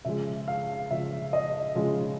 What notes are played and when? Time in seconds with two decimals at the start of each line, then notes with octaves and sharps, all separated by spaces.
0.05 C#3 F3 G#3 E5
0.48 F5
0.91 C#3 F3 G#3 E5
1.33 D#5
1.75 C#3 F3 G#3